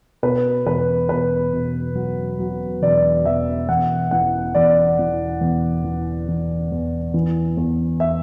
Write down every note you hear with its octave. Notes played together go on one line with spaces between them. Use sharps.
B2 B4
E1 B4
B2 B4
B2
F#3
F#3
E1 D5
E1 E5
E2 F#5
E3 F#5
E2 D5
E3
E2
E3
E3
E2
E3
E2
E5